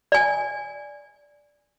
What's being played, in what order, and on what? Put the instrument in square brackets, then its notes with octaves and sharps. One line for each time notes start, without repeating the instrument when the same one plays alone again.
[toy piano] D5 G#5